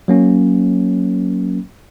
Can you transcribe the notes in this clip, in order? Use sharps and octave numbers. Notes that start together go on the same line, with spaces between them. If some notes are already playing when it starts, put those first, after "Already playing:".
F#3 A#3 C#4